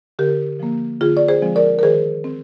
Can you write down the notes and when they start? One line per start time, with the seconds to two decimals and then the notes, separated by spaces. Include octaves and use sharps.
0.19 D3 G4 A#4
0.60 F3 A#3
1.01 D3 F4 G#4
1.17 D5
1.28 G#4 C5
1.42 F3 G#3 C4
1.56 A#4 D5
1.79 A#4
1.83 D#3 G#4 C5
2.24 C4